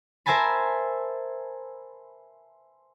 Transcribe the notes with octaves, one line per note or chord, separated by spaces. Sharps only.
A#4 C5 E5 G#5 A5 B5